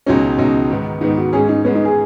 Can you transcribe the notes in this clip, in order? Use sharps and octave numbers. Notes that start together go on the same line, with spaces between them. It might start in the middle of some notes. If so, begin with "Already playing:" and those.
C#2 B2 F#3 C#4 D#4
C#2 B2 F#3 D#4
G#2 D#3 B3
G#2 D#3 B3 D#4
F#4
G#2 G#3 C#4 G#4
D#4
G#2 G#3 B3 C#4
D#4
G#4